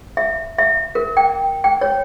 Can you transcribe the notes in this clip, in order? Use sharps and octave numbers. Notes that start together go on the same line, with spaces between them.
E5
E5
A#4
G5
G5
C#5